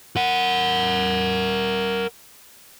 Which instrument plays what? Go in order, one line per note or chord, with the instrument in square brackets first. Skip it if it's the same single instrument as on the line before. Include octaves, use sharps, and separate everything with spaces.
[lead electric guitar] A#4 F#5